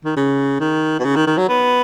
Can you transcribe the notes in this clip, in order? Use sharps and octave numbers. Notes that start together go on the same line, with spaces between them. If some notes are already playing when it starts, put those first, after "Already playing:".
D#3
C#3
D#3
B2
C#3
D#3
D#3
F#3
B3